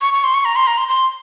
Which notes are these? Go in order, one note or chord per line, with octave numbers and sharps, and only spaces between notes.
C#6
C#6
C6
C#6
A#5
C6
A#5
C6
C6